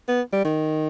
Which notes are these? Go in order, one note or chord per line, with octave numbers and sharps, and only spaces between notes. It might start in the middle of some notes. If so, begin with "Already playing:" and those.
B3
G3
D#3